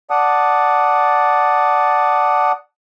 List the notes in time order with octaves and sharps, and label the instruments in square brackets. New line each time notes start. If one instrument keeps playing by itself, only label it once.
[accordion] D5 F#5 A5 D#6